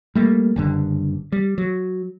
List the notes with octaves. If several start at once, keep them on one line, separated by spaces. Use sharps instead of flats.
G3 A3 A#3
F#1 G2 D3
G3
F#3